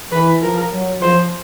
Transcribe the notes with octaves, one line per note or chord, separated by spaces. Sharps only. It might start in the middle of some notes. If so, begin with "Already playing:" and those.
E3 B4
F3 A#4
F#3
F3 C5